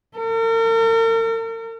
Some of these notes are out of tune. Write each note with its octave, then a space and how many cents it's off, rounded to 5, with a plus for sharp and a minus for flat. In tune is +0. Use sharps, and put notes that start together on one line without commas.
A#4 -45